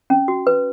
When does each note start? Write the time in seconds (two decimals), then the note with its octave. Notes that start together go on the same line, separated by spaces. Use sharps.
0.10 C#4
0.28 F#4
0.47 B4